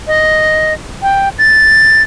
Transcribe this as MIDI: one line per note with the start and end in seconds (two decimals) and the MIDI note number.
0.07 0.73 75
1.02 1.29 79
1.39 2.02 93